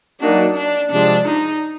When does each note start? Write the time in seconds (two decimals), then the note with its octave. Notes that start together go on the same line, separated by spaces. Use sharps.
0.20 F#3 A#3 D4 D#4 F#4
0.56 D4
0.91 C3 F3 G#3 C4 D4
1.27 D#4